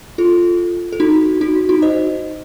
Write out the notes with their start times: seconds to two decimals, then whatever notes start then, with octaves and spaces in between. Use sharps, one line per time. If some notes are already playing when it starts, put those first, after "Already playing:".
0.18 F4 A4
0.93 A4
1.00 D#4 F#4
1.41 D#4 F#4
1.69 D#4 F#4
1.82 C5 D#5